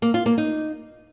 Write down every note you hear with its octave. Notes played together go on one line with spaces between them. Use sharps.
A#3
F4
A#3
D#4